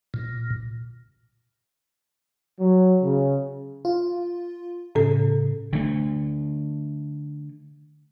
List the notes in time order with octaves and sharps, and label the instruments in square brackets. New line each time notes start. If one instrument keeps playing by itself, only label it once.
[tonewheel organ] A#2
[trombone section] F#3
C#3
[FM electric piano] F4
[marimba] A2 A4 [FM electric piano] C#3
[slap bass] D3 A3